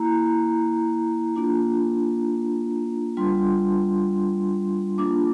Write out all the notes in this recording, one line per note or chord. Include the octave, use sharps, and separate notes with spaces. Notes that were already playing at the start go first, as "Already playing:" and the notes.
Already playing: A#3 E4 A#5
A#3 D4 F4
G3 D4 F4 C6
A#3 D4 F4 D6